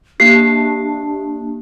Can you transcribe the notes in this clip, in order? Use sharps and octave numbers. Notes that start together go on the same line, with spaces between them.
A#3 D4 G4 C7